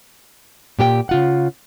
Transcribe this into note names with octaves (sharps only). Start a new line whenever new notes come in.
A#2 G4 A4 G5
C#3 F4 F#5